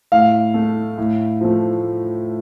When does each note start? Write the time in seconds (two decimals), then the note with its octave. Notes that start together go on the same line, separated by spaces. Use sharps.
0.12 A2 F5
0.54 A3
0.98 A2
1.41 F3 A3